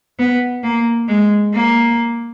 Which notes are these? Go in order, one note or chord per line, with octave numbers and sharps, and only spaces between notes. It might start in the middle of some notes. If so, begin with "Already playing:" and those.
B3
A#3
G#3
A#3